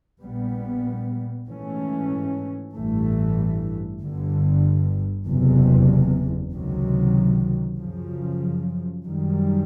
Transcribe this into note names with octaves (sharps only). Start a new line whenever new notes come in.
A#1 A#2 G3 B3
G#2 E3 A3 C#4
A1 G2 E3 A3
G1 G2 D3
F#1 E2 C3
C#2 C3 D#3 F#3
F#2 C#3 F3
F#2 D#3 G3